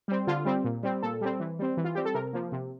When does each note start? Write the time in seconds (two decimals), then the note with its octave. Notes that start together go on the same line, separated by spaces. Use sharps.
0.08 G3 C4
0.27 D3 F4
0.45 G3 C4
0.64 A#2
0.83 G3 C4
1.03 A#2 A4
1.21 G3 C4
1.40 E3
1.59 G3 C4
1.77 E3
1.85 F4
1.95 G3 C4 G4
2.05 A4
2.14 C3 A#4
2.33 F3 A#3
2.52 C3